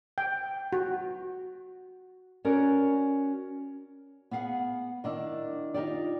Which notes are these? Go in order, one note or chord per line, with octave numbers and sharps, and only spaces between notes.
G5
F#4
C#4 F#4 A#4 D5
B3 G#4 F5 F#5
D#3 D4 E4
D#4 F4 G4 D5